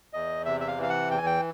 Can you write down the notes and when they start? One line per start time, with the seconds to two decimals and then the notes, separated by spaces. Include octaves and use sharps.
0.13 E2 D#5
0.45 C3 E5
0.61 E5
0.67 F5
0.78 E3
0.83 F5
0.90 F#5
1.11 E2 G5
1.18 G#5
1.26 G5